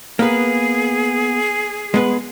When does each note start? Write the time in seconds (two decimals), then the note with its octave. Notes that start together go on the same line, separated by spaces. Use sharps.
0.19 A#3 B3 G#4 B4
1.94 G#3 B3 B4